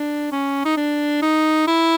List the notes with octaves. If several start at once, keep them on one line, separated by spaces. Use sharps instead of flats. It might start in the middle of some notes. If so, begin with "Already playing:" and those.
Already playing: D4
C#4
D#4
D4
D#4
E4